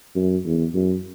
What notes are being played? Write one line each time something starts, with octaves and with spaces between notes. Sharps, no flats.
F#2
E2
F#2